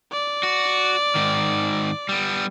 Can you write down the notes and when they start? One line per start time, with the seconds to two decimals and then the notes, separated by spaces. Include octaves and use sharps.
0.12 D5
0.43 F#4
1.15 G#2 D#3
2.09 G3 B3